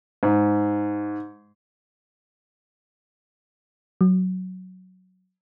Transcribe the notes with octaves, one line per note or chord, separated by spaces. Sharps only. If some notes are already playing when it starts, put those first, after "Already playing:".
G#2
F#3